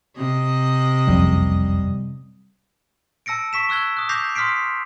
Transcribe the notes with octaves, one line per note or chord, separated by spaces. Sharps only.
C3 D#5
F#1 C2 F2 G3
A5 E6 A#6 C#7 D7
C#6 B6 E7
C#6 E6 F#6 G#6 G7
D#6 F#6
D6 G6 A#6 C7 F7
C6 D#6 F6 B6 C7 D7